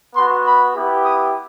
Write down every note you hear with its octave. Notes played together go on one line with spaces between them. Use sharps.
B3 F#4 C6
B5
B3 E4 G4
D#6